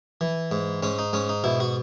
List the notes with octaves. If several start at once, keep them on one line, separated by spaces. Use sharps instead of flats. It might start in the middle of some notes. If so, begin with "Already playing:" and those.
E3
G#2
G#2 C#4
D#4
G#2 C#4
D#4
B2 E4
F#4